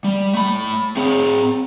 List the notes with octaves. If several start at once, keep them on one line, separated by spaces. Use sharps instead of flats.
G3
A3 B5
C4 G#4